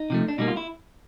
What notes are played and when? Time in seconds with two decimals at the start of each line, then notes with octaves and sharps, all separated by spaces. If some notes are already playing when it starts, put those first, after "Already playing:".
Already playing: D#4
0.10 C3 F3 A3
0.28 D4
0.38 B2 G3 A#3 D#4
0.48 F4
0.57 E4